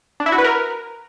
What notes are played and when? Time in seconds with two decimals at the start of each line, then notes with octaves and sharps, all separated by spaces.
0.20 D4
0.26 E4
0.32 F#4
0.38 B4
0.44 A#4